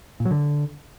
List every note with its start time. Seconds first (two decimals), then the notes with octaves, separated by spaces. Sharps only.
0.20 A#2
0.25 F#3
0.31 D3